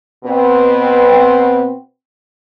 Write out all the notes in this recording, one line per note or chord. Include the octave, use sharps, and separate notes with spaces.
B2 C4 B4